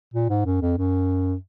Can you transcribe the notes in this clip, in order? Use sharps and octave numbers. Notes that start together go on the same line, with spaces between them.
A#2
G#2
F#2
F2
F#2